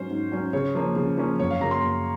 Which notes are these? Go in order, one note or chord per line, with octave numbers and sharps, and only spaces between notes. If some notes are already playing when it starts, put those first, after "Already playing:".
Already playing: G#2 F#3 C#4 C5
G#2
F#3 C#4
C#3 C#5
F3 A#3 C#4
C#3
F3 A#3 C#4
F#2 C#5
F5
C#3 F#3 A#3 A#5
C6
F#2